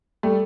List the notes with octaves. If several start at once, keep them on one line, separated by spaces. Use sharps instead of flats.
G3 A3